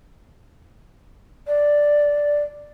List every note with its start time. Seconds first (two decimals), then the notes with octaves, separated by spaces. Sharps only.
1.47 D5